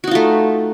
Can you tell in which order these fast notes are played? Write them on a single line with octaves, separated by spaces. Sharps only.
F#4 D#4 F4 A3